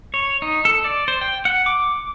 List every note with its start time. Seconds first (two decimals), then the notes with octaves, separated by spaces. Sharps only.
0.14 C#5
0.42 D#4
0.65 A4
0.84 D5
1.08 C5
1.21 G5
1.45 F#5
1.66 D6